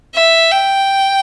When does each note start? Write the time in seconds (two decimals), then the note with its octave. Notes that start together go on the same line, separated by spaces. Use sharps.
0.14 E5
0.51 G5